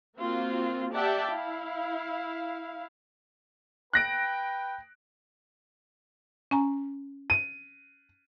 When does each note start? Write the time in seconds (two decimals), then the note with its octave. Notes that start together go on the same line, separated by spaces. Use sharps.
0.18 A#3 C4 F4 F#4
0.93 G4 D5 E5 F#5 G5 A5
1.29 E4 F5
3.93 B4 G5 F#6 A#6 D7
6.51 C#4 G#5 A#5
7.30 D#7